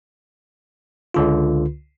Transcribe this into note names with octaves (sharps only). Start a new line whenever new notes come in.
C#2 D3 F4